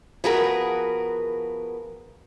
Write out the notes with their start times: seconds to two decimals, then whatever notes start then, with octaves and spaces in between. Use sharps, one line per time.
0.24 F3 B3 F#4 G#4 A#4 B4